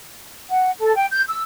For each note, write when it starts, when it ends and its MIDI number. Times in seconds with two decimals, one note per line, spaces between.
0.50 0.70 78
0.78 0.95 69
0.95 1.06 79
1.11 1.22 91
1.29 1.41 88